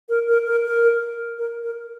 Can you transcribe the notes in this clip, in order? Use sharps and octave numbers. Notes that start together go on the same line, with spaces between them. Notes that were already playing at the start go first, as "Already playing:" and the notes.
A#4
A#4
A#4
A#4
A#4
A#4